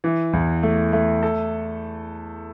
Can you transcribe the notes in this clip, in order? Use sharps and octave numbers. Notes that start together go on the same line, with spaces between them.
E3
E2
A3
A3
A4